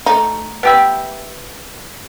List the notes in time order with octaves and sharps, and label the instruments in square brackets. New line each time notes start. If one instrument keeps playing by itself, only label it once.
[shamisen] A3 D#4
[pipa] B3 G4 E5